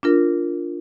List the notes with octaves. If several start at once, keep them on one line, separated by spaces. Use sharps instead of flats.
D4 F4 A#4